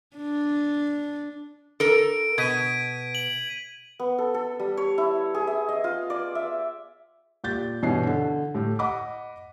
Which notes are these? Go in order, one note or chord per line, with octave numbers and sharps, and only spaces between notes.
D4
A4 A#4 D7
B2 G#6 B6 D#7
F#7
B3
A4
A4
G3
C#5
E4
G#4
E5
D#5
F4
D5
E5
A#2 G4 G6 A6
G2 B2 E3 C#4 D#5 C7
D3
A2 G4
D#5 F#5 B5 D6